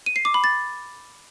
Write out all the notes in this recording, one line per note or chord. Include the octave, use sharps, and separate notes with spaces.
D#7
C7
D6
B5
A6